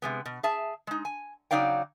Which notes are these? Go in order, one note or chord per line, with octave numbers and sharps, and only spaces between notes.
C3 G#3 B3
B2
G#4 E5 A5
G#3 D#4
G#5
C#3 F#3 D#4 D5 F5 G5